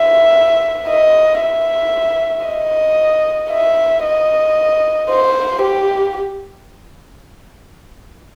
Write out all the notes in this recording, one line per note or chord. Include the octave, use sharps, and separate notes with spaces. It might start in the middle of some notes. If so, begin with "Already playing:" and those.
Already playing: E5
D#5
E5
D#5
E5
D#5
C5
G4